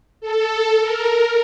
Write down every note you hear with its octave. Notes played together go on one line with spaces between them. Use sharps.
A4
A#4